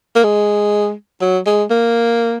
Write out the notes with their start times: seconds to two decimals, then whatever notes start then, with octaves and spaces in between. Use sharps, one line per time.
0.16 A#3
0.24 G#3
1.21 F#3
1.46 G#3
1.70 A#3